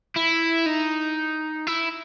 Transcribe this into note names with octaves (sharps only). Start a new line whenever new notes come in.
E4
D#4
E4